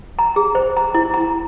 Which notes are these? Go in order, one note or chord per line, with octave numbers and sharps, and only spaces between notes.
A#5
G#4
C5
A#5
E4
A#5